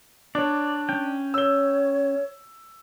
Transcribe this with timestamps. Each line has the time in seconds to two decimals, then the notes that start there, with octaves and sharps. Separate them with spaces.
0.35 D4 C#5 D5
0.89 C#4 G5
1.34 C#5 E6 G7